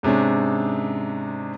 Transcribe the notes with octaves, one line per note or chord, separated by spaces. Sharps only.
G#2 C3 G#3 C#4 D4